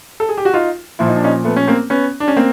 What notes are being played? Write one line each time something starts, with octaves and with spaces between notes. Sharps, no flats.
A4
G#4
G4
F#4
D#4 F4
A#2 F3 E4
D#4
D4
C#4 D#4
A3 B3
C#4
A#3 C4
B3 C#4
D4
C#4
A#3 C4